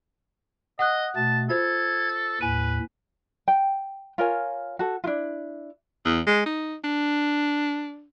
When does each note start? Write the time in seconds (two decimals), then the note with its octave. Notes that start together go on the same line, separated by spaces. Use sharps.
0.79 D#5 F#5 D#6 F#6
1.16 B2 A3 A5
1.49 F4 A4 C5 G#6
2.41 D#2 A2 B4 G#5 D#7
3.48 G5
4.18 F4 A#4 C#5 G#5
4.79 F#4 A4
5.04 D4 E4 F4
6.05 E2
6.26 G#3
6.46 D#4
6.84 D4